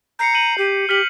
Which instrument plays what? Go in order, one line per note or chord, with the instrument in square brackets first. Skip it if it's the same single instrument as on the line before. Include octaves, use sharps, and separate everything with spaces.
[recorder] A#5 [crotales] G6 C7 C#7
[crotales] G6 D#7 F#7
[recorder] G4 [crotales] G6 D#7
[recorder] G4 [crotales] F6 B6 F#7